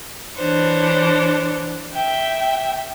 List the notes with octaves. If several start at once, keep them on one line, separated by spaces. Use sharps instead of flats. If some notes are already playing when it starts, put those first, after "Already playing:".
E3 D4 C5 C#5
E5 G5